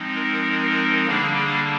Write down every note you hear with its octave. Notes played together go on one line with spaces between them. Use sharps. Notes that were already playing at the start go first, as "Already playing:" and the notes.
Already playing: F3 G#3 C4 D#4
A#4
A#4
D3 G3 A#3 D4 G#4
G#4